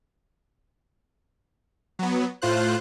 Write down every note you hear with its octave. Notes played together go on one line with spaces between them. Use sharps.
F#3 B3
A2 F4 C5 F#6